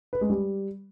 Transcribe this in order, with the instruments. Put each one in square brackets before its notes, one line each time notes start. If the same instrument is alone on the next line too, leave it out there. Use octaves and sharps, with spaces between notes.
[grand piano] B4
G#3
G3